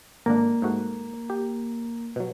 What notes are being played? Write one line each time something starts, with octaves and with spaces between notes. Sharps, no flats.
G#1 D3 A#3 D4
G#2 A3 F#4
G4
B2 F#3